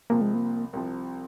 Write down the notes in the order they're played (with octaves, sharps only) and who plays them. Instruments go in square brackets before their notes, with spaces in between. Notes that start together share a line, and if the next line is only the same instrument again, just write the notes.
[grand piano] C2 C3 F3 [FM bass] A#3
[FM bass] G#3
A#3
[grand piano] C2 C3 F3